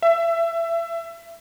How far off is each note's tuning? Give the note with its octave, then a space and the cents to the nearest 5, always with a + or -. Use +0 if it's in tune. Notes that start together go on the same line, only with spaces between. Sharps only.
E5 +25